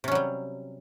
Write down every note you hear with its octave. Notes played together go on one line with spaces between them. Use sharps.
C3 F#3 G3 C#4